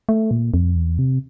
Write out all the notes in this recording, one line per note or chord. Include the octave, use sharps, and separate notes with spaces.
A3
A#2
F2
E2
C3